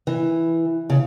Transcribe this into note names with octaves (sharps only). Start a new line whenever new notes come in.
E3
C#3